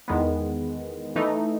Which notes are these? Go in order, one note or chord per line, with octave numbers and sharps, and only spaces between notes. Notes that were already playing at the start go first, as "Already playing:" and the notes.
E2 D#3 G#3 B3
E3 A3 D#4